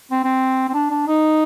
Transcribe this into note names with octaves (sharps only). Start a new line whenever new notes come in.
C4
C4
C4
D4
D4
D#4